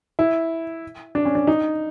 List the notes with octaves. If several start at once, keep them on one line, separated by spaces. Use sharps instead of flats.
E4
D4
C#4
D4
D#4